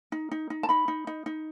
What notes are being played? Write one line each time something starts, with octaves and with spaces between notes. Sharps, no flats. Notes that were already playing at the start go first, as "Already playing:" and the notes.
D#4
D#4
D#4
A5
D#4 B5
D#4
D#4
D#4